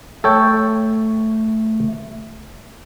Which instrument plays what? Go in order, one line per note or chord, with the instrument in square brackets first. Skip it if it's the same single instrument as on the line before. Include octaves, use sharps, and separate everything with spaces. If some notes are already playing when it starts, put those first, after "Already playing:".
[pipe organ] A3 [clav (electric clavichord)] A4 C#5 G5